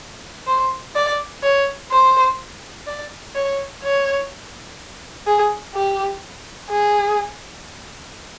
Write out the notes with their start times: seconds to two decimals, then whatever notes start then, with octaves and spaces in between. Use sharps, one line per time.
0.47 C5
0.96 D5
1.43 C#5
1.91 C5
2.87 D5
3.35 C#5
3.83 C#5
5.27 G#4
5.74 G4
6.70 G#4